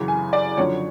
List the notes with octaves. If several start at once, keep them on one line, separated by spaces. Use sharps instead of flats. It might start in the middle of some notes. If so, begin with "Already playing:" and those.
Already playing: F#2 C#3 E3
G#5
D5
F#2 D3 F3 C#5